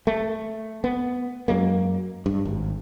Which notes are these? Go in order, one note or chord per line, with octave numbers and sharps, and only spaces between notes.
A3
B3
F#2 F#3 G#3 A#3
G2
G#1